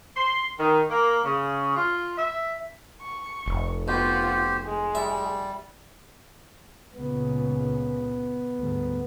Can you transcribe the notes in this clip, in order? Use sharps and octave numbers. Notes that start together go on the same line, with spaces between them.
C6
D#3
A#3
C#3
F4
E5
C#6
F1
B2 F4 G4 C5 F#5
G#3
G3 E5
C#2 A#2 C#3 B3
D2 G#2 G3